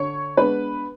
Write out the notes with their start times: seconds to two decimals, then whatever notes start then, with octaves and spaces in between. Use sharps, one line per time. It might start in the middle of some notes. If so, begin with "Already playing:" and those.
Already playing: D3 C#5 C#6
0.37 G#3 B3 D4 B4 B5